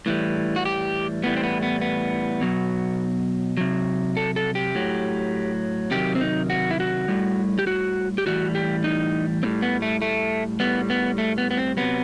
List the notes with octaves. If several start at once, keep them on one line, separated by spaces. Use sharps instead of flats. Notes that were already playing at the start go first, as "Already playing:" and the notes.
A2 E3 G3
F#4
G4
A2 E3 G3 B3
C4
B3
B3
B3
B2 F#3
C3 F#3
A4
A4
G4
A2 F#3
C3 D#3 F#3 G4
C4
D#4
F#4
E4
F#4
A2 G3
G4
F#4
G4
A2 E3 G3 F#4
G4
D#4
A2 G3 C4
B3
A3
A3
A2 G3 B3
B3
A3
B3
B3
C4
C3 F#3 B3